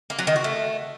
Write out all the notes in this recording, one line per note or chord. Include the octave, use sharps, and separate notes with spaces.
A#3
F#3
D#3
F#4
A3